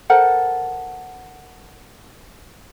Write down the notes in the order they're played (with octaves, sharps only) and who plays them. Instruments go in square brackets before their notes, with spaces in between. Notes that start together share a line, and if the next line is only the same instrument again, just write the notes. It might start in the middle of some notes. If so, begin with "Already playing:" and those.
[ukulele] A4 A#4 C5 F#5